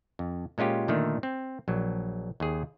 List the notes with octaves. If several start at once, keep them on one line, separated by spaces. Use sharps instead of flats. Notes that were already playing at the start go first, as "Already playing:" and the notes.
F2
A#2 G#3 C#4 F4 G4
A#2 D3 D#3 A3
C4
A#1 F#3
D#2 G#4